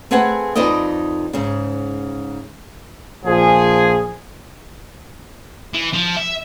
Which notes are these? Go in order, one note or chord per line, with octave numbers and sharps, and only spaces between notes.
A3 C4 G#4 B4 F#5 G#5
F2 D#4 B4 D5 D#5
G#2 C#3
A#1 F3 G#4
E3
F3
E5